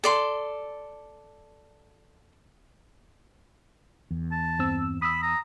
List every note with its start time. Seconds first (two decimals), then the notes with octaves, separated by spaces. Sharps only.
0.04 A4 D5 C6
4.11 E2
4.32 A5
4.59 G2 C4 E6
5.02 B5 D#6 E6
5.22 A#5